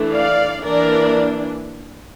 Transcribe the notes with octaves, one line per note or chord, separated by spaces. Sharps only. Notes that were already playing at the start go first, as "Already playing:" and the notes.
Already playing: E3 A3 D4
D5 F5
E3 A#3 D4 A#4 D5